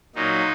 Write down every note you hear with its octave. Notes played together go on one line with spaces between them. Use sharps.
A#2 F#3 D#4